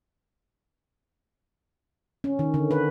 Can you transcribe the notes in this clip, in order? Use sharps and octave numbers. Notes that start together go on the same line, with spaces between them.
C#4
D#3
D3
B4